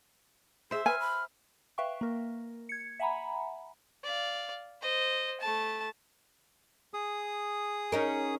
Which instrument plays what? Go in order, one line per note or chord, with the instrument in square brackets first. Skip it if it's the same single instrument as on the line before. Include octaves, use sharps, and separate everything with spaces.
[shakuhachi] G#4 [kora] C5 E5
[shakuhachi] B4 [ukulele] G#5 [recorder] F6
[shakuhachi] B5
[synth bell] B4 E5 F5 G5 C#6
A#3 A#4
G#6 C#7
E5 F#5 G#5 A#5 B5
[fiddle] D5 F5
C5 D#5
A3 A5
[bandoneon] G#4 D#6
[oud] C#4 D#4 A#4